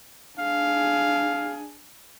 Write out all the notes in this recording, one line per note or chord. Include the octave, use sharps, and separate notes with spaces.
D4 G#4 F5